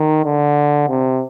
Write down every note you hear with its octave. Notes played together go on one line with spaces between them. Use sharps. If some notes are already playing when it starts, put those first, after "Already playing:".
Already playing: D#3
D3
C3